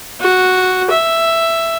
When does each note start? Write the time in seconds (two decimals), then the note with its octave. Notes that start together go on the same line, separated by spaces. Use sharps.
0.21 F#4
0.91 E5